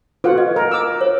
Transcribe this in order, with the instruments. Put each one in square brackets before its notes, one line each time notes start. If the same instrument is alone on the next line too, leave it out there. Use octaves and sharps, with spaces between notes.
[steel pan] F4 F#4 F#5 [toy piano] A4 B4
[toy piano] D#5
[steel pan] A#4
D6 E6
[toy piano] C#5